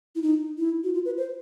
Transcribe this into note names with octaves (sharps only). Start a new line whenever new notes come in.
E4
D#4
E4
F#4
F4
B4
C5